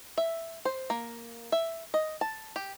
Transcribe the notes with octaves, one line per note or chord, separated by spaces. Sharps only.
E5
C5
A#3
E5
D#5
A5
G4